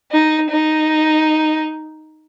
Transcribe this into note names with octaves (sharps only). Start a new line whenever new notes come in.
D#4
D#4